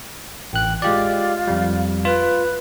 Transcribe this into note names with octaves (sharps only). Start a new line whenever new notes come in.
A1 G5 F#6
G#3 F4 G4 D5
F2 G3
F4 B4